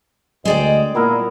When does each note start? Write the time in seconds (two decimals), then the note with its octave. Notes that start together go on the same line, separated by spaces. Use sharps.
0.45 D2 G#3 D5 D#5 G5
0.95 A#2 B3 E4 A#4